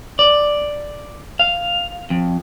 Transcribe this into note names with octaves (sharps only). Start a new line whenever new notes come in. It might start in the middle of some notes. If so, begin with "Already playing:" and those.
D5
F5
F2